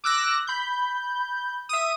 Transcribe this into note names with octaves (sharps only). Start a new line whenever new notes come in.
D6 E6 F#6 A#6
B5 G6
E5 D#6